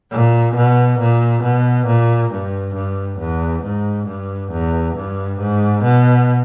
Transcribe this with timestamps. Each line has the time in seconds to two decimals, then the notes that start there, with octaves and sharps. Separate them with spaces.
0.11 A#2
0.56 B2
1.00 A#2
1.43 B2
1.87 A#2
2.31 G2
2.75 G2
3.19 E2
3.63 G#2
4.07 G2
4.52 E2
4.96 G2
5.40 G#2
5.84 B2